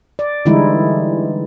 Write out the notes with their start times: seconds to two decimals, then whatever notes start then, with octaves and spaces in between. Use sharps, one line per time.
0.19 D5
0.45 D3 E3 G3 G#3 D#4 E4